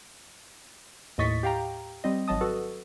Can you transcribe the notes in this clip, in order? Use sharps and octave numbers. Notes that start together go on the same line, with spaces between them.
D#2 A2 D#5 C#6 A6 B6
G4 F5 G5 A#5
G3 C4 D#5
G#1 F#3 D#5 A5 D#6
F#4 A4 B4